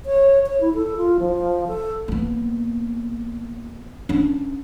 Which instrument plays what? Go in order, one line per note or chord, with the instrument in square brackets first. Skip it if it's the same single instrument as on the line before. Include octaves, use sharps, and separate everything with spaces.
[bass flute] C#5
C#5
E4
A4
F4
F3
A4
[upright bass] A#3 B3
C#4 D4